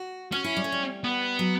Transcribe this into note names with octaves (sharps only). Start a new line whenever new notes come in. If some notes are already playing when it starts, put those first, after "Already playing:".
Already playing: F#4
C#4 F#4
E4
G3
A3
G3
B3
F#3